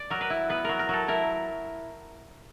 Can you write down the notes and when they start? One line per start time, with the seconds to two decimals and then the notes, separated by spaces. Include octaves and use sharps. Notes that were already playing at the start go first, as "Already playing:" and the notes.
Already playing: D5
0.10 F#3 A#4
0.21 B4
0.30 E4
0.49 B3 B4
0.65 F#3 A#4
0.79 A#4
0.89 F#3 A4
1.08 E4 A#4